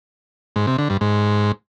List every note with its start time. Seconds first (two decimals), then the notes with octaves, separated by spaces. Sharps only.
0.56 G#2
0.67 C3
0.78 D3
0.90 G2
1.01 G#2